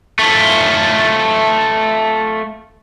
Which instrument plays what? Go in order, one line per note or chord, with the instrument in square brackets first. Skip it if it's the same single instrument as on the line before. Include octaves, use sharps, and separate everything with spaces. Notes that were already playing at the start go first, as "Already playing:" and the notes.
[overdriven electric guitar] A3 F4